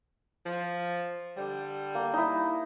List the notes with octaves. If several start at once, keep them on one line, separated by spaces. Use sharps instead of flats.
F3
D3 G3
A#3
D#4 E4